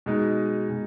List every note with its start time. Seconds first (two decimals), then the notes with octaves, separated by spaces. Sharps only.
0.06 B2 G#3 D#4
0.70 B2 G#3